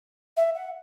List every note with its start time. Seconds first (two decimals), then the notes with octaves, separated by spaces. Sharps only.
0.37 E5
0.55 F#5